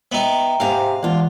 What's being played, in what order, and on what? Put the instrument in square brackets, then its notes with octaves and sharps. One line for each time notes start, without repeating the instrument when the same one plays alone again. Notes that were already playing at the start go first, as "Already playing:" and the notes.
[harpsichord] B3 D#4 [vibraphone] E5 G5 A#5
[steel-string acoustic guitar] G#2 C3 [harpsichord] F5
[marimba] E3 [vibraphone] G#3 F#5 [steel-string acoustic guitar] D4 F4